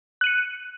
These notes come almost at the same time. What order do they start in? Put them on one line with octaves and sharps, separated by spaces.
F#6 D#7 C#7